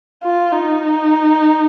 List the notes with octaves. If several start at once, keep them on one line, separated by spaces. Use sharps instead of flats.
F4
D#4